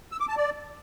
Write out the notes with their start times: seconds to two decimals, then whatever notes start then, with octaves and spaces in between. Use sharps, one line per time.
0.12 E6
0.20 D6
0.29 A5
0.37 D5